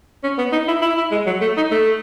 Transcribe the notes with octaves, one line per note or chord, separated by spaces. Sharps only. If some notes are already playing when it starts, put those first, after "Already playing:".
C#4
B3
D#4
E4
E4
E4
G#3
F#3
A3
D#4
A3